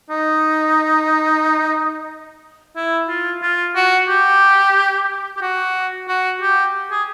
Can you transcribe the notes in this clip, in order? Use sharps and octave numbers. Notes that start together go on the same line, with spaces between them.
D#4
E4
F4
F4
F#4
G4
G4
F#4
F#4
G4
G#4